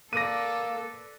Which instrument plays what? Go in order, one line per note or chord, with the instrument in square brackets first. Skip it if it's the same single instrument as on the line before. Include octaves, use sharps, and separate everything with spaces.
[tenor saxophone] A#3 [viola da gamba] A4 [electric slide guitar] B4 D5 [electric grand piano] A#6 D#7